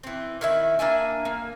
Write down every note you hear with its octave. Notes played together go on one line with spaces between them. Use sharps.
E3 C4
D#3 E4 E5
A#3 D4 E5 G#5
A#3